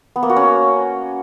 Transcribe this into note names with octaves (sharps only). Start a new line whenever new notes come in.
B3
A#3
F#4
C#4